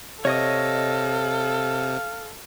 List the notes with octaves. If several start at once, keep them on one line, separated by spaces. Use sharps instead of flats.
C3 A4 C#5 D#5 F5 D#6